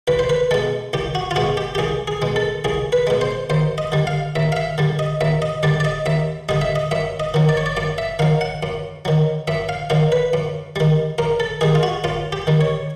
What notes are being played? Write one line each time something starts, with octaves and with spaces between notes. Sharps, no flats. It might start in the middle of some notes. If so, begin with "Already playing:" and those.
C2 B4
C5
B4
B2 G#3 A4
C2 G4
F#4
F4
B2 G#3 F#4
G4
G4
C2 G#4
G#4
B2 G#3
A4
C2 G#4
B4
B2 G#3
C5
D#2 C5
D#5
D3 G3
F5
D#2 E5
F5
E5
D3 G3
D#5
D#2 E5
D#5
D3 G3 D5
D5
D#5
D#2 E5
D3 G3 D#5
E5
D#5
F#2 E5
D#5
D#3 F#3
D5
C#5
D5
F#2 D5
E5
D#3 F#3 F5
F#5
F#2
D#3 F#3
F#2 E5
F5
D#3 F#3 F5
B4
F#2
D#3 G3
F#2 A#4
A4
D#3 G3 G#4
F4
F#4
F#2 F4
G4
D#3 G3
C#5